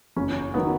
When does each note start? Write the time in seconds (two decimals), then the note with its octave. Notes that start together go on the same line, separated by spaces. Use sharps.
0.16 F#1 C#4
0.54 D#3 F#3 B3